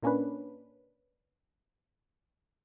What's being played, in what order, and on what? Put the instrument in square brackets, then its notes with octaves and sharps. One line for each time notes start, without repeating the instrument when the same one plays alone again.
[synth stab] A#2 A#3 C#4 D4 B4